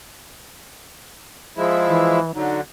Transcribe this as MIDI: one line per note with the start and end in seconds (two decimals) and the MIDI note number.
1.57 2.19 53
1.57 2.19 56
1.57 2.19 64
1.57 1.77 68
1.88 2.32 52
2.35 2.61 50
2.35 2.61 54
2.35 2.57 63